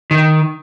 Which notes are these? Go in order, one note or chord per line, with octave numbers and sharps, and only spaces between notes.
D#3